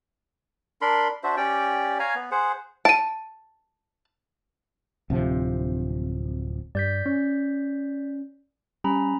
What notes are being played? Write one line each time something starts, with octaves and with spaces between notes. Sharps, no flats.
D4 A#4 B5 C6
D4 F#4 C5 E5
C#4 G4 D5 G5
C#5 F5 G#5 A#5
B3
G#4 C5 F#5
A5 D7 D#7
D1 C3 F3
G2 D5 G6 B6
C#4
G3 C#4 A#5 B5